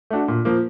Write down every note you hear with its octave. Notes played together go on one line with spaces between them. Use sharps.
A3 D4 F#4
A#2
F3 A#3